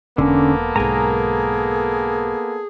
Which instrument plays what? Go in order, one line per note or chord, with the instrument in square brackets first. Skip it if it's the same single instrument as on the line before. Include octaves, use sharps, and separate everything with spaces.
[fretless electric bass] E1 [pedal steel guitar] D3 C#4 [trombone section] A#3 B3 A4
[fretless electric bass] B1 G#2 [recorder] G#4 [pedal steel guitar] A#4 G#5 A#5